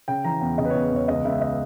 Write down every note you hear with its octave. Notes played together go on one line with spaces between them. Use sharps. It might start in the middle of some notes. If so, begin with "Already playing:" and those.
C#3 G5
E3 A#5
E2 G5
C#3 D#5
B4
E2 C#5
B4
E2 C#5
C#2 D#5
C#2 E5
D#5